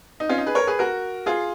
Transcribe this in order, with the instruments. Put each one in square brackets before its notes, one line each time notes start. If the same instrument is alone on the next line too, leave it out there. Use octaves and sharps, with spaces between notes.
[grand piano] D#4
C#4 F4
D#4
G#4 B4
A#4 C#5
G#4 B4
F#4 A#4
F4 G#4